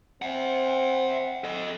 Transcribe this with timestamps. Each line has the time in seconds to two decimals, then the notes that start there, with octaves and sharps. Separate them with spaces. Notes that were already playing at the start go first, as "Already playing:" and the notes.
0.22 C4 E5 F#5
1.44 A4 D#5